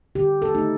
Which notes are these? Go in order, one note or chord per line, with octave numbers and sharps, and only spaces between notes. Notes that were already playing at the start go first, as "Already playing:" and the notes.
D3 G4
A4
A3 D#4